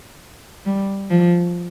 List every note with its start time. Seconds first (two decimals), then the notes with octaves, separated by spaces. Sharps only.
0.66 G3
1.10 F3